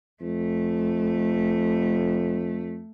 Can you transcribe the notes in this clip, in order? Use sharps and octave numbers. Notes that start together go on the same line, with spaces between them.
F2 A3